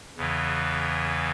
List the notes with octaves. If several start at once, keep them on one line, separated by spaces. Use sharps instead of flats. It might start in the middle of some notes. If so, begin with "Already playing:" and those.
E2 C#3 E3